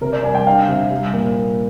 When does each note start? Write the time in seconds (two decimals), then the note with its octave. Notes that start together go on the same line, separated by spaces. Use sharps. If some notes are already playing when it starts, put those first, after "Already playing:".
0.01 C3 A#4
0.13 D5
0.23 G3 G#5
0.35 G5
0.47 D4 F5
0.68 C3
0.91 G3
1.14 A#2